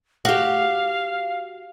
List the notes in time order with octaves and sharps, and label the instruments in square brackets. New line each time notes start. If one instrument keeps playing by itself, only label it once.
[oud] F#4 G4 [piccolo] F5